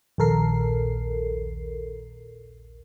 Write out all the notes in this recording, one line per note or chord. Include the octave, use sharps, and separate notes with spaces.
A#1 D#2 A4 A#4 C7